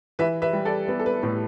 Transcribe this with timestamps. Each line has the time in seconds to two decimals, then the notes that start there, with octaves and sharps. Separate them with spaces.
0.19 E3 B4 E5
0.42 B4 E5
0.53 G3
0.65 A4 D5
0.88 B3 B4
1.00 A4
1.06 B4
1.23 A2 B4